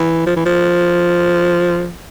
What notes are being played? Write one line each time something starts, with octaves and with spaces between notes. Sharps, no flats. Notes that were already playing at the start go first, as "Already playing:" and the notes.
Already playing: E3
F3
E3
F3